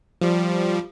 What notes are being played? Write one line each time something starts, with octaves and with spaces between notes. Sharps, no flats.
F3 G3